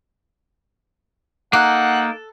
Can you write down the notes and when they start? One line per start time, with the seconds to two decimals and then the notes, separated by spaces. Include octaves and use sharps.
1.53 A#3 D#4 A4 F#5 F#6